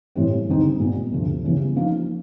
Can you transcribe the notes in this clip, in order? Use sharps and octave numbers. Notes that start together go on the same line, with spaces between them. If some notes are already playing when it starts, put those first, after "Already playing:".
A2 E3 G3 C4
D#2 D3 G3 C4 D#4
A#2 G3 B3
D2 C3 F3
C#3 E3 G3 B3
F3 A#3 D#4